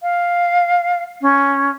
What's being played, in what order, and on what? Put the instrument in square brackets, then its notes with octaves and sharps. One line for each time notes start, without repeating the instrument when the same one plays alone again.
[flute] F5
C#4